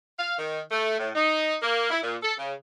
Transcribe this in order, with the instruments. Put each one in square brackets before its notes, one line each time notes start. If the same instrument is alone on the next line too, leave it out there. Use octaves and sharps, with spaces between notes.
[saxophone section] F5
D#3
A3
A2
D#4
A#3
E4
A#2
A4
C#3